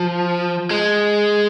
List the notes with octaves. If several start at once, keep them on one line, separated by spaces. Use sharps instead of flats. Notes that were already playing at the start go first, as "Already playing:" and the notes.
Already playing: F3
G#3